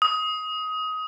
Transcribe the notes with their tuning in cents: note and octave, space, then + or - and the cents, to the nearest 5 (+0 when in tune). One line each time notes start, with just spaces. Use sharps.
D#6 +20